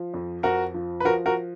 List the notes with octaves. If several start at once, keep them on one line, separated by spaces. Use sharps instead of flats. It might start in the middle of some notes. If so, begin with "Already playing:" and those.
Already playing: F3
F2
F2 F#4 A#4
F3
B4
F3 F#4 A#4
F#4 A#4